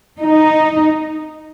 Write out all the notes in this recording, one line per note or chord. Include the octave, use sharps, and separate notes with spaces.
D#4